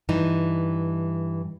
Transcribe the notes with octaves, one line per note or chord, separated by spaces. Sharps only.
G2 E3 D#4